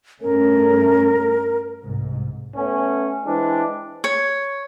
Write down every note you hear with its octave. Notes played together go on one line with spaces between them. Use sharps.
G2 A3 C#4 A#4
C2 G#2
A3 B3 C#4
E3 G#3 C4 D4
C#5